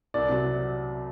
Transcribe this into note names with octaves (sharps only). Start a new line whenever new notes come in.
C2 D5
C3 F#3